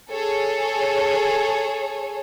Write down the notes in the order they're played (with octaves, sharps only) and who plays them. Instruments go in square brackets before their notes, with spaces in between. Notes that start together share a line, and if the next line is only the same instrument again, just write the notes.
[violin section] G#4 A4 C#5